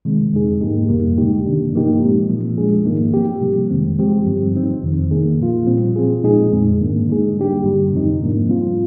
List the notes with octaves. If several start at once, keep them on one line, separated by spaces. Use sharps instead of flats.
C3 D#3 G#3 C4
F2 D3 G#3 D#4 G#4
G#2 F3 A#3 D#4 G4
F2 C3 G3 A#3
D3 G#3 D#4 G4
C3 D#3 A#3 D4
G2 F3 A#3 D#4 G4
A#2 G#3 C4
A#2 F3 A#3
F3 G#3 D4 G#4
G#2 D#3 A#3 D#4
F3 C4 G4
C3 G3 A#3
F2 D#3 G#3 C4
F3 G#3 C4 G4
G2 D3 G3 C4
F3 C4 D#4
F2 C3 D#3
D#3 A#3 D#4 G#4
A#2 F3 A#3 F4
A#2 G3 C4
F3 C4 F4 G#4
A#2 G#3 D#4 G#4
F2 D3 G#3 C4
G#2 D#3 A#3 D4
D3 G#3 D#4 G#4
D3 G3 A#3 D4 G4
G2 D3 G3
F2 C3 F3 C4 D#4
G#2 F3 A#3 D4
C3 G3 C4 F4